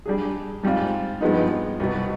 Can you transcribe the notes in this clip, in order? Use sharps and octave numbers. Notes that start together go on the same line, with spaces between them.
G3 D4 G#4
G#2 G3 C4 F4
G2 F3 G#3 B3 D#4
C2 B2 B3